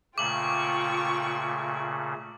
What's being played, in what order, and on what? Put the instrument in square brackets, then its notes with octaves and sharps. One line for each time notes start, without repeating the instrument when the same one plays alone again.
[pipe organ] A#2 C#3 A3 [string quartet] F4 G5 C#6 [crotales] D6 F#7